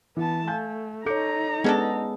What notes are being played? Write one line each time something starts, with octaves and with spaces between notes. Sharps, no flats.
E3 B3 A5
A3 F5 G#5 G6
D#4 A4 C#5 A#5 D6 G6 C#7
G#3 B3 C#4 D4 G#4 A4 D#5